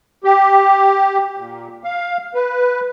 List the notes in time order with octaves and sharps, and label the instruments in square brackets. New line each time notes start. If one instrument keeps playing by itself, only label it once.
[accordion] G4
A#2
F5
B4